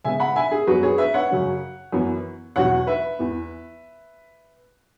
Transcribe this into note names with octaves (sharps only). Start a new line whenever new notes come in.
C#3 G#3 B3 E5 G#5
F#5 B5
E5 G#5
G#4
F#2 F#3 B3 F#4 B4
G#4 C#5
B4 E5
C#5 F#5
F#2 C#3 F#3 C#4
F#2 E3 B3
E2 B2 F#3 C#4 C#5 F#5
B4 E5
E2 E3 B3